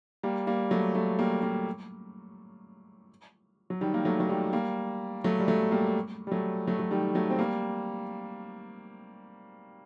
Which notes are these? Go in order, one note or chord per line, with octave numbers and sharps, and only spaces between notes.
G3 A#3
G3 A#3
F#3 A3
F#3 A3
G3 A#3
G3 A#3
F#3
D#3 G3
A#3
F#3 A3
F#3
D#3 G3
G3 A#3
F#3 A3
G3
F#3 A3
G3 A#3
G3
F#3 A3
F#3 A3
F#3
D#3 G3
F#3 A3
C4
G3 A#3